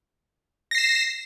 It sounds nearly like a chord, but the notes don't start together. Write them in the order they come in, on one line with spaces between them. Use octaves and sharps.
A#6 C7 E7